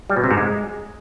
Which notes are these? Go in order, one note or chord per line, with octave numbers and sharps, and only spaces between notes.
G3
B2
C3
G#2
G#3